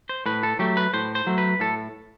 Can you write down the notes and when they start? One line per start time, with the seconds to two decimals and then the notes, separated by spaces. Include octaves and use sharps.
0.09 C5
0.26 A2 B4
0.43 A4
0.59 F#3 A3 G4
0.77 B4
0.93 A2 C5
1.15 C5
1.27 F#3 A3
1.38 B4
1.60 A2 A4